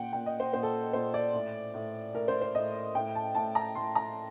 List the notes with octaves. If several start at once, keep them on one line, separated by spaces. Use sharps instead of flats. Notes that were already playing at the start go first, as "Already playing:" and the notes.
Already playing: A#2 F#5 G5
A#2 G5
D#5
C5
A#2 C5
A4
A#2 C5
D5
A2
A2
A2 A#4
C5
C5
A2 D#5
A2 G5
A5
A2 A5
A#5
A2 C6
A#5